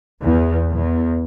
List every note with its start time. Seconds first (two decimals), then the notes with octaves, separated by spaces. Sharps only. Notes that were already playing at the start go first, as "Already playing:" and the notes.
0.22 E2
0.73 E2